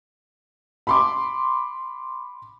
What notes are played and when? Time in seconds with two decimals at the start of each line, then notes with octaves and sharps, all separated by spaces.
0.87 B5 C6 D6